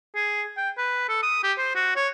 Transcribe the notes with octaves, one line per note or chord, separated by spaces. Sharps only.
G#4
G5
B4
A4
D#6
G4
C5
F#4
C#5